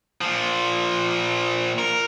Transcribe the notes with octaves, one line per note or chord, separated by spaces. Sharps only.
A#2 F3
A#4